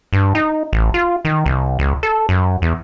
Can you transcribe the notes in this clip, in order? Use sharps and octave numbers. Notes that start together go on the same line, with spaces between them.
G2
D#4
A1
F4
D#3
C2
C#2
A4
F#2
E2